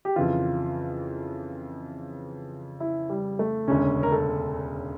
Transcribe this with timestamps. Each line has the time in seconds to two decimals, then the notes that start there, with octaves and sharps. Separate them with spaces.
0.05 G4
0.16 F2 C#3 E3 F4
2.80 E4
3.10 G3
3.39 A3
3.68 E1 D2 C#3 C#4
4.03 A#4
4.12 A4